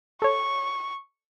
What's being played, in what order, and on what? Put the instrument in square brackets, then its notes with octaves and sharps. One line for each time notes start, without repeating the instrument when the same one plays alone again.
[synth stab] A4 C#5 [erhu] C#6